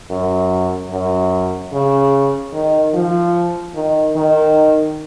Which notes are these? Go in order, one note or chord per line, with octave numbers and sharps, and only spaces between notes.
F#2
F#2
C#3
D#3
F3
D#3
D#3